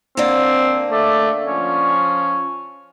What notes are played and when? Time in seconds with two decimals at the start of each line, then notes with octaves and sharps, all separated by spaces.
0.17 D3 A#3 C4
0.92 A3 D5
1.47 F3 C#4